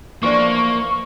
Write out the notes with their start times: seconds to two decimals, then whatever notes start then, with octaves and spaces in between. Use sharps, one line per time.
0.23 E3 F3 A#3 D4 C#6